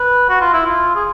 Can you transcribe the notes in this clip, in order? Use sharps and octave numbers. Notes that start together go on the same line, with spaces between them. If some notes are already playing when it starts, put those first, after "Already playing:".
Already playing: B4
F#4
F4
E4
F4
G#4